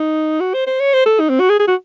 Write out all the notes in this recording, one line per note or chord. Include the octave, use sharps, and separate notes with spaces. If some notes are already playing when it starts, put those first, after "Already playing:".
Already playing: D#4
F#4
C5
C5
C#5
C5
A4
D#4
C4
F#4
G#4
G#4
F#4